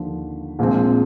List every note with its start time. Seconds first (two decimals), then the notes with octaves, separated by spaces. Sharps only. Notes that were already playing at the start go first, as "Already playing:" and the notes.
Already playing: D#2 D3 F3
0.59 A#1 A#2 F3 G#3 C4